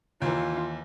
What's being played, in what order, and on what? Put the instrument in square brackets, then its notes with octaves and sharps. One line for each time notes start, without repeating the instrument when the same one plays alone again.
[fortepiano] D#2 E3 [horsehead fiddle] F4